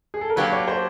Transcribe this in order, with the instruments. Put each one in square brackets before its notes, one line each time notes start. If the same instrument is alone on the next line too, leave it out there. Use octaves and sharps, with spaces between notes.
[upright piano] G#4
A4
A#4
[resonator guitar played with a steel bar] F#3 A#3 D4 G4 [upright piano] B4
[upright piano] C#5
C5